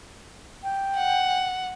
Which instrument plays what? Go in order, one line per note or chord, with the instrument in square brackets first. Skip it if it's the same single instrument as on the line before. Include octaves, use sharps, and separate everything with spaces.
[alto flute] G5
[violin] F#5